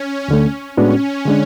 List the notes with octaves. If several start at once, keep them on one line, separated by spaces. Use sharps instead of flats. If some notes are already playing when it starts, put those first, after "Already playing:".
Already playing: C#4
D2 D3 A3
A2 G#3 B3 C#4 D4 F#4
D3 G#3 D4